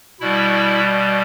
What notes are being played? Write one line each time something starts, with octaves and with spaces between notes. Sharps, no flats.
B2 G3 E4